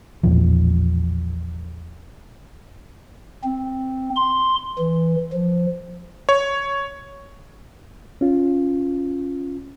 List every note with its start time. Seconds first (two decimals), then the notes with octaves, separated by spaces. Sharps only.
0.23 A1 E2 A#2 F3
3.44 C4
4.16 C6
4.79 E3
5.33 F3
6.29 C#5
8.21 C#4 F4